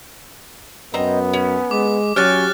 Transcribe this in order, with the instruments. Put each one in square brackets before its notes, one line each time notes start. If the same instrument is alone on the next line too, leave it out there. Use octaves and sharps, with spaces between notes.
[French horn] F#2 [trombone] B3 [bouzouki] C4 D#5 A#5
[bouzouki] C#4
[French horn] G#3 [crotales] D6
[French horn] F#3 [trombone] C#4 [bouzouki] G4 C#5 G#5 [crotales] F6 F#6 A6